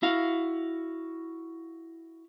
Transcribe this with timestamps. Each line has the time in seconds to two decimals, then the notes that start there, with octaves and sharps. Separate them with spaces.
0.03 E4 F#4 F5